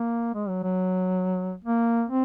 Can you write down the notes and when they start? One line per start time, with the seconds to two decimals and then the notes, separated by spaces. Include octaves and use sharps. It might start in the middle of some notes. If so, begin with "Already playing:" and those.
Already playing: A#3
0.35 G#3
0.49 F#3
0.63 F#3
1.65 A#3
2.09 C4